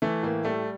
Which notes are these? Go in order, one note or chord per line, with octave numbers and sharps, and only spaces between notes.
E3 A3
A2 A#3
G3 A3